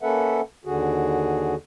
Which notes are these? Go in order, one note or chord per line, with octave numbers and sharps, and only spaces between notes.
A#3 C#4 A4 B4 E5 F#5
D#2 D3 F#4 G#4